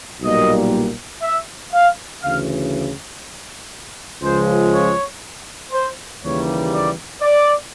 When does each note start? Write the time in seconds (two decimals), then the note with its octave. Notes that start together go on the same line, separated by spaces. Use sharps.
0.22 B1 A#2 G3 A#3 D#5
1.22 E5
1.72 F5
2.22 D2 C#3 E3 F5
4.22 C#2 C#3 F3 G#3 C5
4.73 C#5
5.72 C5
6.23 D#2 C#3 E3 G3 A#3 C#5
6.72 D5
7.22 D5